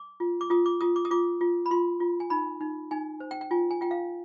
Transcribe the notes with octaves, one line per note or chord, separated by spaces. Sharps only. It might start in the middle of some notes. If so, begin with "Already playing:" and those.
Already playing: D6
F4
D6
F4 D#6
D6
F4 D#6
D6
D#6
F4 D6
F4
B5
F4 C6
F4
G#5
D#4 B5
D#4
D#4 G#5
C5
G5
G5
F4 G#5
G#5
F4 G5
F5